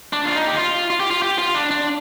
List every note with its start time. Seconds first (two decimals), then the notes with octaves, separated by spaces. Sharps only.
0.13 D4
0.25 F4
0.35 D#4
0.47 G4
0.57 F4
0.90 F4
1.00 G4
1.11 F4
1.22 G4
1.39 F4
1.55 D4
1.71 D4